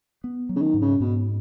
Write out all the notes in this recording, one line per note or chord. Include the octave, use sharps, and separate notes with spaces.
B3
F#3
C#3
D#3
G#2
C#3
G#2 B2